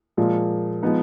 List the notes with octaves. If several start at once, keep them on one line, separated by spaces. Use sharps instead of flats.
A#2 F3 G#3
F3 G#3 B3 D#4